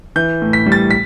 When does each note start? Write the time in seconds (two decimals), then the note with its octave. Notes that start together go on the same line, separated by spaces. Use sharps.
0.16 E3 G6
0.42 A2
0.53 B6
0.66 G3
0.72 A6
0.91 B6